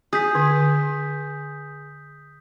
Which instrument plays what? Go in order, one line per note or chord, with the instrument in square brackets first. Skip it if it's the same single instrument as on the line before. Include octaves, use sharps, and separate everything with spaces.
[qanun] G#4 [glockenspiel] D#6 G6 B6
[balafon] D3